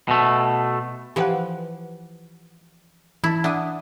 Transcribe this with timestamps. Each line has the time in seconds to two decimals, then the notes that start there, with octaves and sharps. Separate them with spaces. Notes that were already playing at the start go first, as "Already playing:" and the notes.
0.08 B2 A3
1.16 E3 F3 G4 B4 F#5
3.24 E3 E4 A5
3.44 D4 E5 F#5 D#6